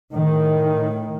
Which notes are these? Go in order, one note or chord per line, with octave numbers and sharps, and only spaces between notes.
A2 D#3